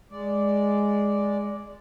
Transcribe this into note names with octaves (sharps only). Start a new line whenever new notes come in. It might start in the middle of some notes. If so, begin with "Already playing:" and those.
G#3 D5